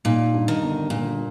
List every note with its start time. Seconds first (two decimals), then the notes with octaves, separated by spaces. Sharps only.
0.05 A#2 D#4
0.34 G2
0.48 D#3
0.62 G1
0.90 G2 A#2